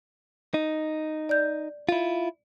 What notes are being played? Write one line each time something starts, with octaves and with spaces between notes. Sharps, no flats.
D#4
D5 G6
E4 F4